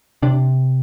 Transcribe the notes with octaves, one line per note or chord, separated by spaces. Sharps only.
C3 D4